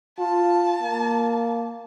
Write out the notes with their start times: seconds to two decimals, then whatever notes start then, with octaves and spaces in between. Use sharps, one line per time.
0.19 F4 A5
0.82 A#3